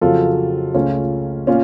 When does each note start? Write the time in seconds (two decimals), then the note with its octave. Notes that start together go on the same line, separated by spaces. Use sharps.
0.01 F2 C#3 F#3 F4 A4
0.74 C#2 C#3 A3 C#4 F4
1.47 A#2 C#4 F4